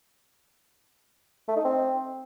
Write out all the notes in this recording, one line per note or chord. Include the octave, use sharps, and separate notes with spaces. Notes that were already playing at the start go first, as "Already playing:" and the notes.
A3
D#4
C4